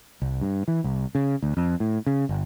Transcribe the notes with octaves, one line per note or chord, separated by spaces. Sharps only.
C2
G2
E3
C2
C#3
D2
F2
A2
C#3
G1